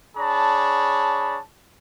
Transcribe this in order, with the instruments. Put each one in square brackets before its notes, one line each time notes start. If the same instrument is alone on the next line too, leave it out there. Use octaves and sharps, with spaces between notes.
[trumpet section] D4 G#4 C#5 A5 B5